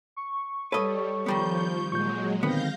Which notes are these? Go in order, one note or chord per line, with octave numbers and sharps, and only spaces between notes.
C#6
G3 A4 B4 C#5 D#5
D#3 F3 G3 B3 G6
A#2 F#3 G#3 C#6 G6
D3 D#3 B3 C4 F5 G6 A#6